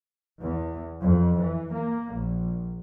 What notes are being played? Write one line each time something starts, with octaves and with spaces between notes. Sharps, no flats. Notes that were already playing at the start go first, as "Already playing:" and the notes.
E2
F2
E3
A#3
A#1